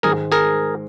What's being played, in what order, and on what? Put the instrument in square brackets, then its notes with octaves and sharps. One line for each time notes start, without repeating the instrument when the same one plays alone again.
[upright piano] G#2 D#3 G#3 [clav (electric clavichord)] G#4 A#4
[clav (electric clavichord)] G#4 A#4